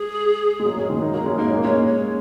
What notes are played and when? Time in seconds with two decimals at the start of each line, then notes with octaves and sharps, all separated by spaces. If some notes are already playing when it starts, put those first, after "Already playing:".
Already playing: G#3 G#4
0.60 G#3
0.65 F#3 A#3
0.77 G#3 C#4
0.90 D#3 G#3
1.01 A#3 D#4
1.14 F#3 A#3 G#4
1.26 G#3 C#4
1.38 A#3 D#4 A#4
1.50 C#4
1.57 A#3
1.63 G#3 C#4 C#5
1.87 C#5